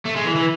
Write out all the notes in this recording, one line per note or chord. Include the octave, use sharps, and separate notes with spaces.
A3
G#3
E3
E3